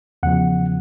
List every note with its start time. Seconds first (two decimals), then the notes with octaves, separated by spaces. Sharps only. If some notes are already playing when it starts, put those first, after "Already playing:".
0.23 E2 C#3 F3 F#5